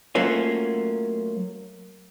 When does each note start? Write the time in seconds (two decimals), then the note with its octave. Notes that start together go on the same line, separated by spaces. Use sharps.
0.15 F#3 A3 A#3 C#4 F4